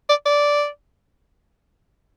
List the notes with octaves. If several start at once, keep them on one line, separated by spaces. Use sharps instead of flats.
D5
D5